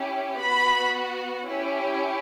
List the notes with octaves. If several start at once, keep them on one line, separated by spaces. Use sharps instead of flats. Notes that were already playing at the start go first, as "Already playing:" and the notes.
Already playing: C#4 E4 G4
B3 F#4 B5
C#4 E4 G4